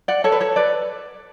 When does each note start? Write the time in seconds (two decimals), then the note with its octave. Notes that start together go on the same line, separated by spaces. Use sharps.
0.08 D5 F#5
0.24 A4 C#5
0.32 B4
0.41 A4 C#5
0.56 B4 D5